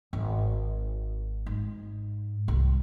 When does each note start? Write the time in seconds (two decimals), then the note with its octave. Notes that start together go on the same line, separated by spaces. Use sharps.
0.13 G#1
1.46 G#2
2.48 C2